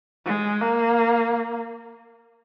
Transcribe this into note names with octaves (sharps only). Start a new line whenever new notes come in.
G#3
A#3